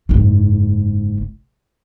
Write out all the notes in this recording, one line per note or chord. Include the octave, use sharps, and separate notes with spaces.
F#1 G#2